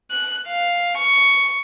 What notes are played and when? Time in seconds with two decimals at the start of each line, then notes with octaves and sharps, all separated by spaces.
0.11 F#6
0.49 F5
0.98 C#6